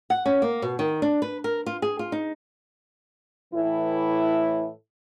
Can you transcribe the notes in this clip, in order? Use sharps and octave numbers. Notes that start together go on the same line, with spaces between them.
F#5
C#4
A#3
B2
D#3
D4
B4
A#4
F4
G#4
F4
D#4
A2 E3 E4